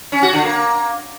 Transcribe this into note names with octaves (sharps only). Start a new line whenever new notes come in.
C#4
F#4
D3
A#3